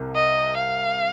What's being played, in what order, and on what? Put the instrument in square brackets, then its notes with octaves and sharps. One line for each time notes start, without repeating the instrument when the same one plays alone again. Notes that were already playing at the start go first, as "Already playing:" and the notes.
Already playing: [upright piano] C2 C3
[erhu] D#5
F5